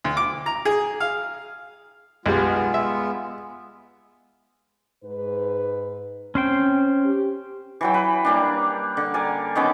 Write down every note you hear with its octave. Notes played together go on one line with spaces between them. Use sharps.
D2
D6
A#5
G#4
F5
B1 G3 G#3 B3 F4
E5
G#2 B4
C4 C#4 C5 G5
G4
E3 F#3 G5
B4
G3 A#3 D4
D3
A#4 D5 G#5
D#3 B3 C#4 D6